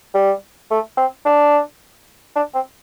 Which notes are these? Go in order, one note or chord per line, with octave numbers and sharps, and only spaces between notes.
G3
A3
C4
D4
D4
C4